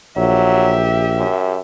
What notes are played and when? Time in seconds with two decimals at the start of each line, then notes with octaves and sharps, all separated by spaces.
0.17 A#1 F#3 G4 E5
1.17 F#2